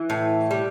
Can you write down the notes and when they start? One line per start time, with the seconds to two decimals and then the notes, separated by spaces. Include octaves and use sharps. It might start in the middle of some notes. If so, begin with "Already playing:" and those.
Already playing: E3
0.10 A2
0.51 G3